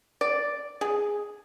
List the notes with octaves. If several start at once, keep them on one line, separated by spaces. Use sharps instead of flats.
D5
G#4